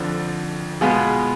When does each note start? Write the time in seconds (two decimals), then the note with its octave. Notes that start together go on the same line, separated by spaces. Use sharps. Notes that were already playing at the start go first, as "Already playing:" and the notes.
Already playing: F2 D3 F3
0.81 B2 G#3 B3 F4 G#4